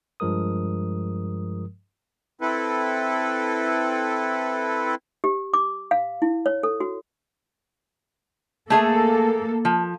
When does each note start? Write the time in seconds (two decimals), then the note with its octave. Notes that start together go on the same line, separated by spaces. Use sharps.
0.20 G2 F3 G#3 A#4 D#6
2.41 C4 E4 A4 B4
5.24 G4
5.54 D6
5.91 F5
6.22 E4
6.46 C#5
6.63 A4
6.80 F#4
8.70 A3 A#3 G#4 A4 E5
9.65 F3